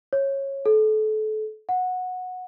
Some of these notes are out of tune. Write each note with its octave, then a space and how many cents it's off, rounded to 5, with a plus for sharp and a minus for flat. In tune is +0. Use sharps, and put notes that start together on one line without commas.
C#5 -20
A4 -30
F#5 -15